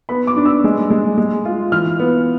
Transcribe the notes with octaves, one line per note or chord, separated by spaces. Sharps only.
B3 B5
D6
D4
E6
G#3
G#3
G#3
F4
E3 F6
B3